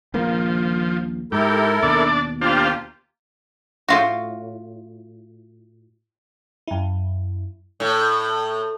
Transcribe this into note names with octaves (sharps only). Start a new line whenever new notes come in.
D#1 A#1 F3 A#3
G#2 E4 G4 A4 A#4
D#2 B2 D4 D5
A#3 D4 F4 G4 C5 F5
A2 F4 F#4
F#2 E4
A2